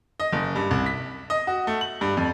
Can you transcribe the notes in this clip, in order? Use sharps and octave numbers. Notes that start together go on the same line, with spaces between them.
D#5
F#1
G2
C2
B6
D#5
F#4
A3
F#7
G2
F2